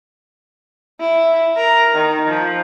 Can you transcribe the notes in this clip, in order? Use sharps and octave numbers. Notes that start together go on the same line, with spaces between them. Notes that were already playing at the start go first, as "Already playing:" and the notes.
E4
A#4
D#3
F3